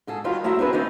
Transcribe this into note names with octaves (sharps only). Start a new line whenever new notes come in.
G#2 G#4 A4
D#3 G3 D#4 F4 F#4
F#3 A3 E4 E5 A#5
C4 D4 G#4 B4
D#3 C4 C#4 D#4